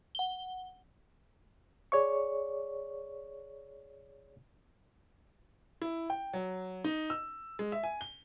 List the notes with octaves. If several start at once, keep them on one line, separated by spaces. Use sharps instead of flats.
F#5 G7
G#4 C#5 D5 C#6
E4
G5
F#3
D#4
E6
G#3
E5
G#5
G7